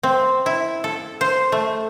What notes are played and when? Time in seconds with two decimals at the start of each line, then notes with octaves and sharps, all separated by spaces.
0.03 C4
0.46 E4
0.84 A4
1.21 C5
1.52 A3